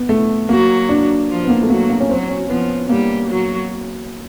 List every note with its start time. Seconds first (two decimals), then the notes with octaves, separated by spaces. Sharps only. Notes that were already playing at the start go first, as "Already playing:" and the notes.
Already playing: B3
0.09 A3
0.49 F#3 A#3 F#4
0.89 D4
1.29 F3 F4
1.45 B3
1.49 A#3
1.62 A3
1.70 F#3 A#3 F#4
1.90 A#3
2.00 C#4
2.09 F#3 C4 F#4
2.29 C#4
2.49 F3 B3 F4
2.89 G3 A#3 G4
3.29 F#3 F#4